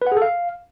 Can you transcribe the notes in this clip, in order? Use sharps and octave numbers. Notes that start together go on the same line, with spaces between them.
B4
F#5
G#4
A4
F5